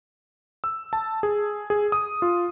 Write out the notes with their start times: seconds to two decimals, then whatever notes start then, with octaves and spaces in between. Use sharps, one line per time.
0.64 E6
0.93 A5
1.23 G#4
1.70 G#4
1.92 D#6
2.22 F4